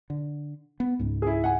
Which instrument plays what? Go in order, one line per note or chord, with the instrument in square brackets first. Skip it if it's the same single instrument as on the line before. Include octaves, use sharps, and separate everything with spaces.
[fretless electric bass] D3
B3
C#2 G#2
[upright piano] E4 G#4
F#5 G#5